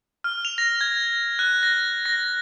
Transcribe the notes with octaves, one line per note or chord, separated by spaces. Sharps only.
F6
F7
A#6
G#6
F#6
A#6
A#6